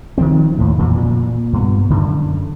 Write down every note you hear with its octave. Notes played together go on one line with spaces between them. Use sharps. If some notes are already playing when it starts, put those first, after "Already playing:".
D#3 F3 C4
D#2 A2
F2 A#2 E3 F#3
A#2
G2 B3
F#2 D3